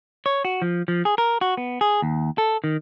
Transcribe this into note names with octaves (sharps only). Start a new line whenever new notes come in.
C#5
F#4
F3
F3
G#4
A#4
F#4
B3
G#4
D#2
A4
D#3